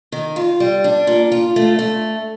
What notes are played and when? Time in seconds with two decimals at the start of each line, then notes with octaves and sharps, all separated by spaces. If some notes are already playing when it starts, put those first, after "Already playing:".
0.12 D#3
0.36 F4
0.60 G3
0.84 D4
1.07 A#2
1.32 F4
1.56 A3
1.79 A3